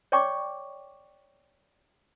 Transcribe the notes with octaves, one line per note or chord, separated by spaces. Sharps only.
C#5 D5 G5 C#6 D6